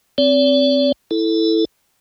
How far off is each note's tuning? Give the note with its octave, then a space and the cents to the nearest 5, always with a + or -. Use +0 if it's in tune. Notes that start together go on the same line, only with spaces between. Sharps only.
C4 +0 D5 -45
E4 +0 A4 +0